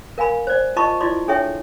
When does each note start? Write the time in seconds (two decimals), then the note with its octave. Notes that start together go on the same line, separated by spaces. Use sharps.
0.18 A#4 F5 G#5 B5
0.47 C5 D5
0.76 F4 D#5 A5 B5 C#6 D6
1.00 E4 F4 D5 C6 D6
1.28 D4 G#4 A4 C#5 E5 G5